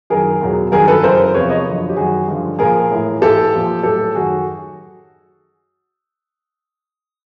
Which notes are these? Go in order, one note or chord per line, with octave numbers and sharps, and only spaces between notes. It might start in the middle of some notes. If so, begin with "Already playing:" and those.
F#2 D#3 F#3 G#4 A#4
E2 B2 F#3
G2 D#3 F#3 G#4 A#4
A4 B4
F#2 C#3 E3 A#4 C5
E2 C3 F3 B4 C#5
C#5 D#5
F#2 D3 F3
G4
F#2 D#3 F#3 F#4 G#4
G2 D3 F3
A#2 F3 G#4 A#4
A2 E3
G#2 E3 G4 A4
A#2 F3
A2 F#3 G4 A4
F#2 D#3 F#3 F#4 G#4